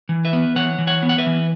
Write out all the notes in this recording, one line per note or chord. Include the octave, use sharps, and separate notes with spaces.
E3
B4 E5
B3
E3 C#5 F#5
E3
C#5 F#5
B3
F#5
B4 E5
E3